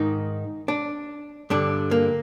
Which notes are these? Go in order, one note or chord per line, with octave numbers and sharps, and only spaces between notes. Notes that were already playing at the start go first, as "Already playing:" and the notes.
Already playing: G#2 D#3 D#4
D4
G2 D3 D4
A#3